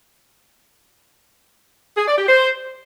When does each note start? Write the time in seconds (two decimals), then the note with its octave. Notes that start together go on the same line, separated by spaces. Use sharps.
1.97 G#4
2.07 D5
2.18 G4
2.28 C5